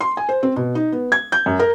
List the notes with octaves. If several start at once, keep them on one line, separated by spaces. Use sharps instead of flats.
C6
G#5
C5
C4
B2
D#4
B3
G#6
G6
F#2
A#4